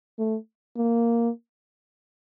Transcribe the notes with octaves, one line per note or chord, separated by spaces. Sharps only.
A3
A#3